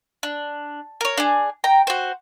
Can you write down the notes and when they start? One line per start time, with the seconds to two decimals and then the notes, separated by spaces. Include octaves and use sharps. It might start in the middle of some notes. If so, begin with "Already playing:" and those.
0.23 D4
1.01 A#4 C#5
1.18 D4 G#4
1.64 G5 A#5
1.87 F#4 C5